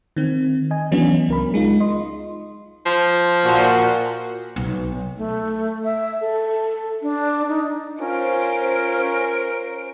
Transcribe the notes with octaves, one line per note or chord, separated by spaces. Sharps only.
D#3 C4
D#5 G#5
E3 F#3 B3 C#4 D4
C#2 A#4 B5
G#3 D#4 F4
D#5 C6
F3
A#2 F#4
B1
A3
E5
A4
D4
D#4
C#4 F4 A#4 C5 D7